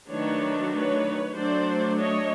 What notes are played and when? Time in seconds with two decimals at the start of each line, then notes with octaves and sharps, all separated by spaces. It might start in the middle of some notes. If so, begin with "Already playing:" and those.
0.10 D#3 F#3 A3 D4 B4 C#5
0.74 B4 C#5
1.36 F#3 A3 D4 C5 D5
1.99 C#5 D#5